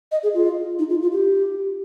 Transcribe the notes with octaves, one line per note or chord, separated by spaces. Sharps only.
D#5
G#4
F4
D#4
F4
F4
G4